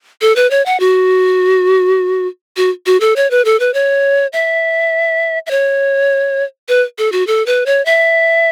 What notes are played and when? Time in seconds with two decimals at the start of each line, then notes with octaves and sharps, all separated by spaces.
0.21 A4
0.36 B4
0.51 C#5
0.66 F#5
0.80 F#4
2.57 F#4
2.86 F#4
3.00 A4
3.16 C#5
3.31 B4
3.45 A4
3.60 B4
3.74 C#5
4.33 E5
5.46 E5
5.51 C#5
6.68 B4
6.98 A4
7.12 F#4
7.27 A4
7.46 B4
7.66 C#5
7.86 E5